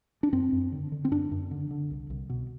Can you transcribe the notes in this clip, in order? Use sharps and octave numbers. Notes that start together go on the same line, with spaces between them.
D4
F#2 C4
F#2
D3
D3
C4
F#2 D4
F#2
D3
D3
C2
C2
B2